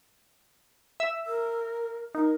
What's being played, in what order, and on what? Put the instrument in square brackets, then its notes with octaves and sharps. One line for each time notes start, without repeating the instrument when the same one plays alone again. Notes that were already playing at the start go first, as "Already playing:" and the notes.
[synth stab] E5 E6
[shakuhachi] A#4
[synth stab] D#4 [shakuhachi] A#4